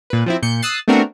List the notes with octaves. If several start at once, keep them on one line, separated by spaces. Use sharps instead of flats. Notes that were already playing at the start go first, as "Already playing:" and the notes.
A#2 B4
F3 C4 E4
A#2 G6 C#7
D#6 E6 F#6 A6 C7
A3 B3 C4 D4 F#4 A#4